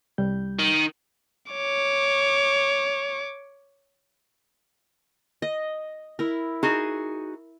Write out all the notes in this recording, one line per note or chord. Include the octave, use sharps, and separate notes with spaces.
C2 G3 G6
D#3
C#5 D6
D#5
E4 A#4
D#4 F#4 G#4